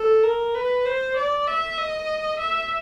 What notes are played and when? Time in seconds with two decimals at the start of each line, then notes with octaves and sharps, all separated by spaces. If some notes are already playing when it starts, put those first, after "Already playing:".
Already playing: A4
0.23 A#4
0.55 B4
0.85 C5
1.16 D5
1.47 E5
1.78 D#5
2.39 E5